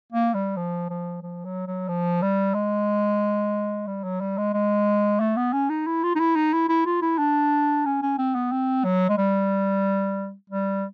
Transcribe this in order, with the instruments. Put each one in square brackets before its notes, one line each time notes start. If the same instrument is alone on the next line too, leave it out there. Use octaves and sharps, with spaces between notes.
[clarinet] A#3
G3
F3
F3
F3
F#3
F#3
F3
G3
G#3
G3
F#3
G3
G#3
G#3
A3
B3
C#4
D#4
E4
F4
D#4
E4
D#4
E4
E4
F4
E4
D4
C#4
C#4
C4
B3
C4
F#3
G#3
G3
G3